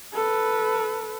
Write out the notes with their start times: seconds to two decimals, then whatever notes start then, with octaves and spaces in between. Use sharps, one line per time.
0.14 A4 B4